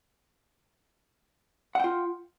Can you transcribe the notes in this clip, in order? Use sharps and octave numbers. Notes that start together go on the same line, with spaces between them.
F4 F#5 G5